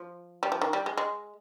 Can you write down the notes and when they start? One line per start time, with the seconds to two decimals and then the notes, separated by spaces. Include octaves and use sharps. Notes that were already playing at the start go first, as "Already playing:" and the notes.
Already playing: F3
0.43 G3
0.52 F3
0.62 D#3
0.73 G3
0.86 G#3
0.98 G#3